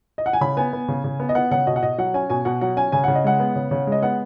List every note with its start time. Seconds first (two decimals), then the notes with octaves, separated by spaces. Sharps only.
0.18 D#5
0.26 F#5
0.33 G#5
0.41 C#3 B5
0.57 B3 G#5
0.73 B3
0.88 C#3
1.04 C#3
1.20 B3
1.29 D#5
1.35 B3 F#5
1.51 C#3 F#5
1.67 B2 D#5
1.76 F#5
1.83 B2 D#5
1.98 F#3 F#5
2.14 C#4 G#5
2.30 B2 G#5
2.45 B2 F#5
2.61 F#3 F#5
2.77 C#4 G#5
2.92 C#3 G#5
3.04 C#3 F#5
3.15 D#5
3.24 G#3 F#5
3.40 B3
3.56 C#3
3.71 C#3
3.87 G#3 D#5
4.03 B3 F#5